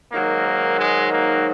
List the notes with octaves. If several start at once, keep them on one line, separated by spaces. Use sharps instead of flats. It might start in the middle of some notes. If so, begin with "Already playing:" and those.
G#2 D#3 F#3 A#3
G#3
A#3